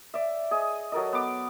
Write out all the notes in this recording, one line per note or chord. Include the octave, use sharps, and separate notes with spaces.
D5 E5
G#4 D#5
F#3 A4 A#4 D#5
B3 D6